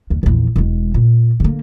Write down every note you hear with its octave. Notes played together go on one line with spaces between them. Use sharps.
D#2
A#1 E2
E1 G#3
A#2
D3 A#3